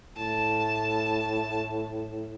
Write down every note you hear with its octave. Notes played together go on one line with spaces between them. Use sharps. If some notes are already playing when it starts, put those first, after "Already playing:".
A2 A5